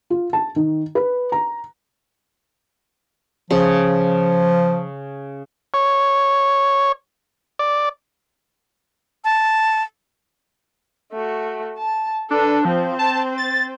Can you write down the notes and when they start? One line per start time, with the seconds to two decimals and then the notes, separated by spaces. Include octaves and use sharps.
0.10 F4
0.33 A5
0.56 D#3
0.95 B4
1.32 A#5
3.51 C#3 F3
5.74 C#5
7.59 D5
9.25 A5
11.13 A3 F#4
11.78 A5
12.31 D4 A4 B4
12.65 F3 C4 C5
12.99 A5
13.38 A6